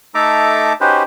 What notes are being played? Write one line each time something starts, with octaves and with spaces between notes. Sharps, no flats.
A3 D#4 A4 E5 A#5 D6
C#4 D#4 F#4 G4 B4 C5